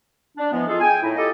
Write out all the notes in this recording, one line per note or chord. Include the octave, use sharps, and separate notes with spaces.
D4
E3 F3 G#3 B3
D#4 F4 G#4 A4
G#4 G5 G#5
A2 D#4 E4
F4 G4 A4 D#5